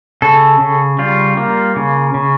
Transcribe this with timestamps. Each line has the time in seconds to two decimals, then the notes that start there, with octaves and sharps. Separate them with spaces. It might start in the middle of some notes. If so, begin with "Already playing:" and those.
0.22 C#3 A4
0.60 C#3
0.99 G3 F4
1.37 A#3
1.76 C#3
2.14 C#3